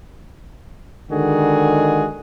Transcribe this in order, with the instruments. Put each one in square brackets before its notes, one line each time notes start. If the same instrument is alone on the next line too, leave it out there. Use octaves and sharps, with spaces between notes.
[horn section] D3 D#3 G#3 F#4 G#4